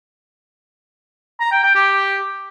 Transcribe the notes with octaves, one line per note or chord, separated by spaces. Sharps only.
A#5
G5
G5
G4